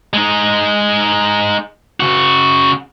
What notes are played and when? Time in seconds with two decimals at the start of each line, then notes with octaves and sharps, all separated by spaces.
0.13 G#3 D#4
2.00 C#3 F#4